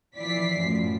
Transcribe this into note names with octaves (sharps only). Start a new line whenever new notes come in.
E3 F3 D5 B6 C7
F#2 A2 F3